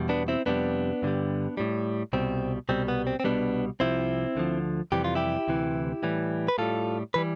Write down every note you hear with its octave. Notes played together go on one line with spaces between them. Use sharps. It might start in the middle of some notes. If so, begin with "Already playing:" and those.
Already playing: E2 B2 G3
B3 D4
C4 E4
F2 C3 G3 B3 D4
G2 D3 G3
A2 G3
C2 B2 G3 C4
C2 B2 G3 C4
B3
C4
C4
C2 B2 G3 B3 D4
C2 C3 F3 C4 E4
D2 D3 F3
F2 C3 E3 G3 G4
F4
E4 G4
D2 C3 E3
A2 E3 G3
B4
A2 G3 F4 A4
E3 G3 B4